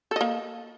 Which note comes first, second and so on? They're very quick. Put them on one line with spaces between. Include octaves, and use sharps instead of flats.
A4 D#5 A#3